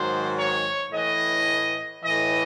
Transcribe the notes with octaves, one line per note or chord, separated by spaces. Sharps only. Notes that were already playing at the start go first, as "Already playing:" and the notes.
Already playing: G#2 D#3 F#3 C5
C#5
A2 E3 D#5
A2 E3 D#5